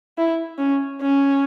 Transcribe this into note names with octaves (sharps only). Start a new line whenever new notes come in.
E4
C#4
C#4